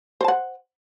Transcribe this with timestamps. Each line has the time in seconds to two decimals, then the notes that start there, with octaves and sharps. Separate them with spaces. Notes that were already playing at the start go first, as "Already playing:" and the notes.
0.21 C5
0.24 A5
0.28 F#5